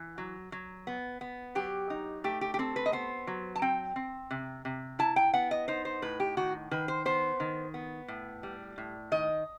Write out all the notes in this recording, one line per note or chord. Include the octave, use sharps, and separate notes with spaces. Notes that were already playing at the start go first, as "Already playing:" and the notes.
Already playing: E3
F#3
F#3
B3
B3
F#3 G4
D#4
A3 G4
G4
G4
C4 A4
B4
D#5
B3 C5
F#3
A5
C4 G5
C4
C3
C3
E4 A5
G5
B3 F#5
D#5
D#4 C5
C5
A2 B4
G4
D#3 F#4
D#3 B4
C5
B3 C5
D#3
B3
A2
G3
A2
D#3 D#5